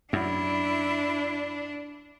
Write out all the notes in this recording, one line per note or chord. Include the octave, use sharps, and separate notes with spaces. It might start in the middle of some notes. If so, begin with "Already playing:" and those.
F#2 D4 E4